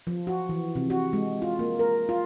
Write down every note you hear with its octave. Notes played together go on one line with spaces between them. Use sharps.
F3
F#4
E3
C3
F#4
G#3
F4
A#3
A#4
F4